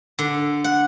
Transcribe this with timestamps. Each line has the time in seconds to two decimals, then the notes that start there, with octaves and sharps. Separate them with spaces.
0.19 D3
0.64 F#5